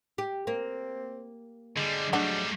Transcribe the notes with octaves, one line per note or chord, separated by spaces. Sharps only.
G4
A#3 C4
D3 G3 G#3
F#3 G3 A3 D4 F#5